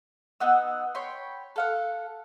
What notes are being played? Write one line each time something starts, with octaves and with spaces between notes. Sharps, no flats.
B3 D#4 F#5 E6
C#5 G5 B5 C6
A4 F5 F#5